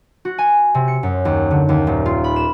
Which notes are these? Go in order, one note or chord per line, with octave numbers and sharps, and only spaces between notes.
F#4
G#5
C3
C#7
F#2
D#2
D3
D#2
D#1
F4
B5
E7